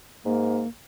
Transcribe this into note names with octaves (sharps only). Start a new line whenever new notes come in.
G#2 A#3